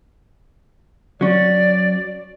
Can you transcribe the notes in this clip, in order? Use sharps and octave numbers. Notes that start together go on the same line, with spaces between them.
F#3 C#4 D5